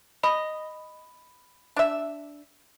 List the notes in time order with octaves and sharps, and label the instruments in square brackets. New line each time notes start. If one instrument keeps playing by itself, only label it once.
[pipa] D#5 [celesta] B5
[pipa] D4 E5